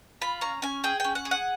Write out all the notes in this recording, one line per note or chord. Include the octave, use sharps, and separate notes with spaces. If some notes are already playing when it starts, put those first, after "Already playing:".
F4 B5
C#4 A#5
C#4 G#5
G#4 G5
C#4 G5
F#5
G#4
F#5